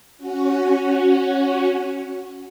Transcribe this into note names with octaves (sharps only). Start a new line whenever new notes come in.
C#4 F#4